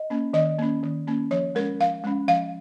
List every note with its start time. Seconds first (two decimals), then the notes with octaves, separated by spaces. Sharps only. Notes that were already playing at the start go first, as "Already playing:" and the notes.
Already playing: D#5
0.10 A#3 C#4
0.33 D#3 D#5
0.58 A#3 C#4
0.83 D#3
1.07 A#3 C#4
1.31 F3 C#5
1.55 G#3 C#4 A#4
1.80 F3 F5
2.04 G#3 C#4
2.28 F3 F5